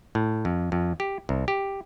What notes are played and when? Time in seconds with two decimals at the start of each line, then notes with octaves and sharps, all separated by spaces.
0.15 A2
0.45 F2
0.72 F2
1.00 G4
1.29 C2
1.48 G4